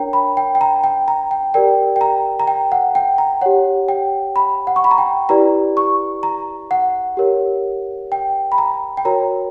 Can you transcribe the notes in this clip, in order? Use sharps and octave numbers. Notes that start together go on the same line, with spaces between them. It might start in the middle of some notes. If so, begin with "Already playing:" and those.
Already playing: D4 A#4 C#5 G5 A#5
B5
G5
G5
A#5
G5
A#5
G5
G4 A#4 D5 G5
G5
A#5
A#5
G5
F#5
G5
A#5
G4 C#5 F#5
G5
B5
F#5
C#6
B5
A#5
G5
E4 G4 B4 D5 A#5
C#6
A#5
F#5
G4 A#4 C#5
G5
B5
A#5
G5
F#4 A#4 C#5 A#5